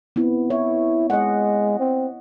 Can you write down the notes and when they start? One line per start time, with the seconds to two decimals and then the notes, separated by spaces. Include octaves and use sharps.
0.16 B3 C4 E4
0.50 E4 C#5
1.10 G#3 D#5 F#5
1.79 C4